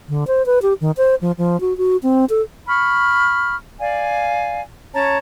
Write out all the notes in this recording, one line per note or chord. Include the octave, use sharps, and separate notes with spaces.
D3
C5
B4
G4
D#3
C5
F3
F3
F#4
F#4
C4
A4
B5 C#6 F6
D5 F5 G#5
C#4 C#5 A5 A#5